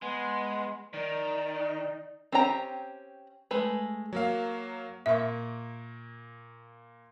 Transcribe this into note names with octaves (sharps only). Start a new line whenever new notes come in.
G#3 B3 C6
D#3 D#4 D5
C4 C#4 G4 G5 A#5
G#3 A3 B4
F#3 A#3 F5
A#2 A#3 E5 C#6